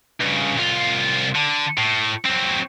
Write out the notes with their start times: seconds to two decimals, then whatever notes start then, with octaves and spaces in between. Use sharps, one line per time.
0.20 G2 C#3
0.57 C2 F4
1.35 D3
1.78 A2
2.26 F#3 C4